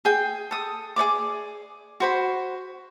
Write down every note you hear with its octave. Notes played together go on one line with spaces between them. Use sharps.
G#4 G5
A4 D#6
G#4 C#5 D5 D6
F#4 C5 B5